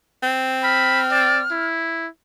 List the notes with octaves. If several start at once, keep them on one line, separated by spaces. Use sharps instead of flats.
C4
B5 F6
D5
E4